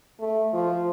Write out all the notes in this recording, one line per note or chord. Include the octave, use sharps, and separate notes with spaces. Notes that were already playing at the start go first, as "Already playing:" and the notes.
A3
F3